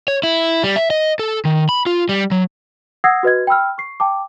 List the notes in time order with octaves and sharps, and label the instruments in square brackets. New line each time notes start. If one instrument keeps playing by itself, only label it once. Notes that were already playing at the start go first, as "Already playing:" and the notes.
[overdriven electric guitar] C#5
E4
G3
E5
D#5
A4
D#3
B5
F4
G3
F#3
[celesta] F#5 D#6 E6 G#6 A#6 C7
F#4 B4 D#5 G#6
G5 B5 E6 F6
C#6 C7
G5 A5 D6